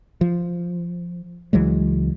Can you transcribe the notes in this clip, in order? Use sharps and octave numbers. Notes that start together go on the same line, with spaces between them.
F3
C#2 E3 F#3 G#3